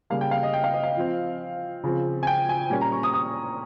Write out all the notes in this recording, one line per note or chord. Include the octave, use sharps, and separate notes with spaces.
C#3 G3 A#3 F5
G5
F5
D#5
G5
F5
D#5
F5
F3 C4
C#3 F3 C4
G#5
G5
G#5
A#2 G3 A#3 C#4 G#5
A#5
C#6
D#6
D#6